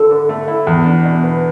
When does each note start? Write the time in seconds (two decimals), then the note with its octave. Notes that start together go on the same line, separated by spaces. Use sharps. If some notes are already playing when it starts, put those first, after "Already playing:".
Already playing: D3 E4 A4
0.11 D3
0.29 A3
0.48 E4
0.67 E2
0.86 D4
1.04 B2
1.24 B3